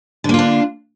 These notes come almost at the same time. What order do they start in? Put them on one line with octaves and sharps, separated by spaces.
D3 A#3 F4 D4